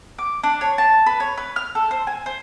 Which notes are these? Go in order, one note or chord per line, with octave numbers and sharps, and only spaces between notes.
D6
D4
C#5
A5
B4
C#5
B4
F6
A4
C5
G#5
C5